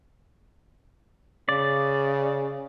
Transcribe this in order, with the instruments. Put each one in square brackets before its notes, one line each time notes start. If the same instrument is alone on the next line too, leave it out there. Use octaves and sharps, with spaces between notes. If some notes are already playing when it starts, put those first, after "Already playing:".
[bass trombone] C#3 [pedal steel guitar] D5